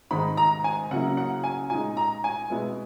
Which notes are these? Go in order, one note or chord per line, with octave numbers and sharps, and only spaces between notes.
G#2 D#3 G#3 D#4 B5
A#5
G#5
C#3 F#3 A#3 E4 F#5
F#5
G#5
A#2 G#3 D#4 G#5
A#5
G#5
B2 G#3 B3 E4